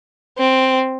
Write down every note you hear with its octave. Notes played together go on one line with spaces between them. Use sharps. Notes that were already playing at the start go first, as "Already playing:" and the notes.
C4